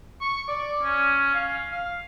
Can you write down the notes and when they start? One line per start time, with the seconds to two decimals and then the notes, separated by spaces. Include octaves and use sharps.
0.21 C#6
0.48 D5
0.83 C#4
1.34 F5
1.71 F5